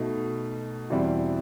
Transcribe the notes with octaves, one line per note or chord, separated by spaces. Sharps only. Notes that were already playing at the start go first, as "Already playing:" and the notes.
Already playing: B2 A3 D#4
E2 B2 G3 C4 E4